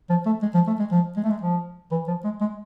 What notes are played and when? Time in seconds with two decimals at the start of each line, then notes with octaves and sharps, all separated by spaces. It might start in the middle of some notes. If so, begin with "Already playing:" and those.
0.10 F3
0.26 A3
0.43 G#3
0.55 F3
0.67 A3
0.80 G#3
0.92 F3
1.17 G#3
1.24 A3
1.30 G#3
1.42 F3
1.92 E3
2.08 F3
2.25 G#3
2.41 G#3